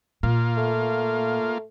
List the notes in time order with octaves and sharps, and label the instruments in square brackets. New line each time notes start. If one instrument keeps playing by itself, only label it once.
[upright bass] A#2 [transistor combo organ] A#3 F4
[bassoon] A3